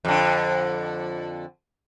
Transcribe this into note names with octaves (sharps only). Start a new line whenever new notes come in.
F2 D3